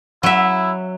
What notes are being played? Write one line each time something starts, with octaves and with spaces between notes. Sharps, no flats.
F#3 E4 E5